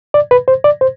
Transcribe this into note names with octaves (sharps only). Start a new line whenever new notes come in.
D5
B4
C5
D5
C5